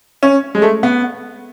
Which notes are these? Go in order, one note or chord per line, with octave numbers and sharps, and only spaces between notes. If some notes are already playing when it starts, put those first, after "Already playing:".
C#4
G#3
A3
B3